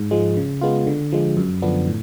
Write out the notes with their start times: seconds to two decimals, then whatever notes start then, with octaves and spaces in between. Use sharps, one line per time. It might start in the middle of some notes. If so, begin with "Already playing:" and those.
Already playing: G#2
0.11 F3 G#3
0.37 C#3
0.62 G#3 B3 F4
0.87 D3
1.12 F3 G#3
1.37 F#2
1.62 D3 F3 B3 D4
1.88 A2